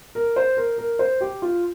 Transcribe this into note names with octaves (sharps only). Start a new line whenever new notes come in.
A#4
C5
A#4
A#4
C5
G4
F4